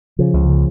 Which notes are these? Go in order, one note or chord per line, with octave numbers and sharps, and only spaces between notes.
C#3 F3
C#2
C#3